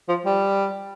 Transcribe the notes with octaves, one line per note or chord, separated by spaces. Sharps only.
F3
G3